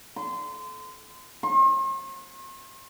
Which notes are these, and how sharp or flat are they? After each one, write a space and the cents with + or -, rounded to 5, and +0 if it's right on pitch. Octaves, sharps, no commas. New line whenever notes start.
C6 -25
C6 +45